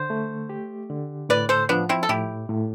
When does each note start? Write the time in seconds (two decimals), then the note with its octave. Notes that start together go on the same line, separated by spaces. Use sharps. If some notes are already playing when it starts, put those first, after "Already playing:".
Already playing: D3 C5
0.10 A3
0.49 G4
0.90 D3
1.29 A2 B4 D5
1.49 A4 C5
1.69 F3 B3 D4
1.89 C4 E4
2.03 A4
2.09 A2 E4 G4
2.49 A2